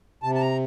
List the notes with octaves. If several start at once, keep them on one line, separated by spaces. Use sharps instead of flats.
C3 A5
A5
A#5